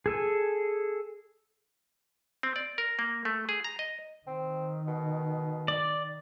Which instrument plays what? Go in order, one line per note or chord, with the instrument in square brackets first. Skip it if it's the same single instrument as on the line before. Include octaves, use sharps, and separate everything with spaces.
[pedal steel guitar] G#4 A4 G#5
[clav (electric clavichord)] C4
D5
A#4
A#3
A3
G#4
A#5
D#5
[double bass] D#3 [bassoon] C4
[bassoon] B2
[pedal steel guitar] D5